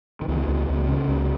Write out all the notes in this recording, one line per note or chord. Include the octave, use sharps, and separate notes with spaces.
D#3
C#2 E3
C#2
C#2
C#3
C#2